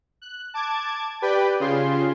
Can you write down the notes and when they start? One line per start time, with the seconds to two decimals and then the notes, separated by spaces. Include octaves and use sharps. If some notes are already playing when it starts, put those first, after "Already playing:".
0.22 F#6
0.54 A5 D6 G#6
1.22 G4 B4 D5 G5 B5
1.60 C#3 F4 G#4 C6